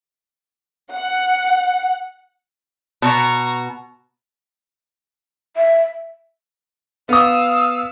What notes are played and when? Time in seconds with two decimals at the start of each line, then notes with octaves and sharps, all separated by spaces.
0.93 F#5
3.02 B2 A#5 C#6
5.56 E5
7.09 B3 F5 D#6 E6